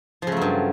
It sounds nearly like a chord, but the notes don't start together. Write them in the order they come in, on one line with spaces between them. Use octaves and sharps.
F3 C#3 A3 F#3 G2